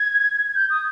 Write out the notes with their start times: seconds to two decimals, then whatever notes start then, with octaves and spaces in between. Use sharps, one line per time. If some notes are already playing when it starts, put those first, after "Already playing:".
Already playing: G#6
0.55 G6
0.70 D#6